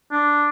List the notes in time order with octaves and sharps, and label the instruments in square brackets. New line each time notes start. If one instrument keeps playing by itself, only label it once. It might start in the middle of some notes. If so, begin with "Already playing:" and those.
[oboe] D4